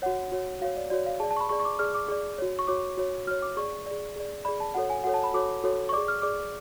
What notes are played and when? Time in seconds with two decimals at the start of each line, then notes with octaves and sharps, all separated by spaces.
0.02 F#4 C#5 F#5
0.32 F#4 C#5
0.61 F#4 C#5 F5
0.77 D5
0.90 F#4 C#5 D5
1.06 F5
1.20 G#4 D5 A5
1.31 A5
1.37 C#6
1.40 B5
1.49 G#4 D5 C#6
1.60 C#6
1.65 D6
1.79 G#4 D5 F6
1.95 D6
2.08 G#4 D5
2.38 F#4 C#5
2.59 C#6
2.68 F#4 C#5 D6
2.97 F#4 C#5
3.27 F#4 F6
3.31 C#5
3.42 D6
3.57 G#4 D5 C#6
3.86 G#4 D5
4.16 G#4 D5
4.45 G#4 D5 B5
4.60 A5
4.74 F#4 A4 C#5 F#5
4.90 G#5
5.04 F#4 A4 C#5 F#5
5.14 A5
5.24 B5
5.34 F#4 A4 C#5 D6
5.64 F#4 A4 C#5
5.89 C#6
5.93 D5 D6
5.97 G#4
6.08 F6
6.22 G#4 D5 D6